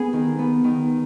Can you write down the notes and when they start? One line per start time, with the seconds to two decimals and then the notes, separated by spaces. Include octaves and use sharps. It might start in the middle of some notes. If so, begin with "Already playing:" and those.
Already playing: B3 G#4
0.13 D#3
0.39 B3
0.64 D#3